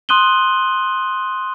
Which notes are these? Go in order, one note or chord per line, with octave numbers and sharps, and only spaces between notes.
C6 D#6 F#6 D#7 F#7 G7